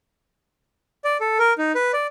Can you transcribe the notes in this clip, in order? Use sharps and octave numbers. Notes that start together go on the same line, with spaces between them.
D5
A4
A#4
D#4
B4
D5